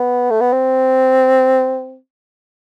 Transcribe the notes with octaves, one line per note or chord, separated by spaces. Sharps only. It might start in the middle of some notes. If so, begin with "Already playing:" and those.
Already playing: B3
A3
B3
C4